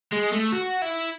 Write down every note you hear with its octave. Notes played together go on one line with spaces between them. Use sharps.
G#3
A3
F#4
E4